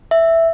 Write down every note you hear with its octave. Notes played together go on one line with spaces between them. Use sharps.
E5